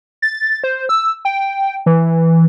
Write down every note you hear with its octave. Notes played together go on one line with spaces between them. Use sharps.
A6
C5
E6
G5
E3